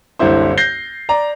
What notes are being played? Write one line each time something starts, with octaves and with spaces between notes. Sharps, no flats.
F#1 C2 D3 E4 C5
G6 A#6 C7 G7
D5 A#5